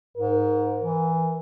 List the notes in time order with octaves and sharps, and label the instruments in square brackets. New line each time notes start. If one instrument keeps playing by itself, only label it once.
[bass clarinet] G#2 [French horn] A#4
[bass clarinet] E3